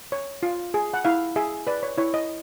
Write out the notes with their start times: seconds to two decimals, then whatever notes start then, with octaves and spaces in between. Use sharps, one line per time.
0.12 C#5
0.43 F4
0.74 G#4
0.94 F#5
1.05 E4 F5
1.36 G#4 E5
1.67 B4 D5
1.83 C#5
1.98 E4 C#5
2.14 D#5